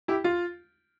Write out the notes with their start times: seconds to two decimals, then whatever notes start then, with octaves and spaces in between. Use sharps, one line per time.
0.08 E4 G4
0.24 F4